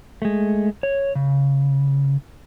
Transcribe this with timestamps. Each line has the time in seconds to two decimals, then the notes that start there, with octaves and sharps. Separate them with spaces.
0.22 G#3 A3
0.83 C#5
1.15 C#3